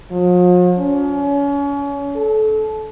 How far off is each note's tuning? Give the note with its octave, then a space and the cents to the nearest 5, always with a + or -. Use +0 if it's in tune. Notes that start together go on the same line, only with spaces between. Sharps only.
F3 +45
C#4 +35
A4 -25